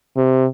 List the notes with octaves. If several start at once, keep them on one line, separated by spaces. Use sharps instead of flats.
C3